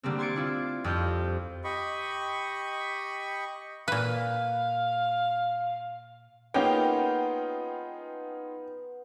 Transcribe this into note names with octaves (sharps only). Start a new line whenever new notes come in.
D3 G3 A3 A#3 C4
C6 G#6 A6 C#7 D7
D4 E4 F4
F2 G3 F4 G6
G4 D#5 B5 C#6
A#2 B4 F5
A#3 B3 C#4 D#4 F4 G#4 G5